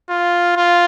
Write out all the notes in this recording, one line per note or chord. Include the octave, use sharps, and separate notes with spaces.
F4
F4